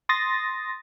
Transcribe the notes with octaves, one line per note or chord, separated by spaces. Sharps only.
C6 D#6 A6 A#6